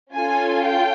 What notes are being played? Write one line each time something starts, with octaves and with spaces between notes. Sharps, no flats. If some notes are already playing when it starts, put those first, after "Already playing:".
C#4 F4 A4 G#5
G5